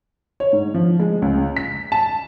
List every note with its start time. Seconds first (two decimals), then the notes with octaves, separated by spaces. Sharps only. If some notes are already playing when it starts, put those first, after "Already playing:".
0.40 C#5
0.53 G#2
0.74 F3
0.99 G#3
1.22 C#2
1.57 B6
1.92 A5